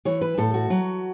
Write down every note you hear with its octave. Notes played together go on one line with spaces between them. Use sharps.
E3 C#5
B4
A2 A4
F#4
F#3